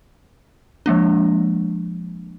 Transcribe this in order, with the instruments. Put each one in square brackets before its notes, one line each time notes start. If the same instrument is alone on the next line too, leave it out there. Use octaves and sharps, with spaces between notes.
[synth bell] F3 G#3 A#3 D4